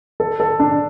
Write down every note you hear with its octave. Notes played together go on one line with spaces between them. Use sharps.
A4
A4
D4